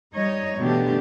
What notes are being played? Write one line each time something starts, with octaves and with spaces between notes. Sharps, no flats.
G3 D#4 C#5 D#5
B2 D3 E3 A3 D4 G4